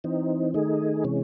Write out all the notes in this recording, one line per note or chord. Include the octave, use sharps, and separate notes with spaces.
E3 C4 D#4
D#3 A3 D#4 G#4
C3 E3 G#3 C#4